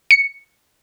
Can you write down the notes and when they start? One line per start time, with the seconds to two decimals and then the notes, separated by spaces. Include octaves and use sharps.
0.11 C#7